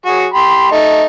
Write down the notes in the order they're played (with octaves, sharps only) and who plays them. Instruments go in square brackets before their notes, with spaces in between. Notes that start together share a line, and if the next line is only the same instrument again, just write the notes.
[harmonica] F#3 F#4 G#4
G4 B5 C6
A3 D#4